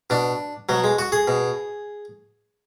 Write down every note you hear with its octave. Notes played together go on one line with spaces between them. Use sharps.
B2 D4
B2 F#3
G#3
F#4
G#4
B2